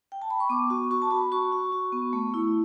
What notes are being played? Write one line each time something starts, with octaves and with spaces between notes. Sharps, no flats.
G5
A5
B5
C#6
B3 D6
F#4 C#6
F#4 C#6
A5
F#4 B5
F#4 C#6
F#4
F#4
B3
A3
E4